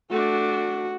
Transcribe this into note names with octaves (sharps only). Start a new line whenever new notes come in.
A3 D4 F#4